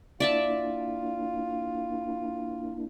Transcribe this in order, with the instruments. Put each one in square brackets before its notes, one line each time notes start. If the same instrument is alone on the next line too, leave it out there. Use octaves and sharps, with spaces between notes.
[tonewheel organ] A#3 D4 E4 [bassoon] F4 [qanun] D5 E5 A5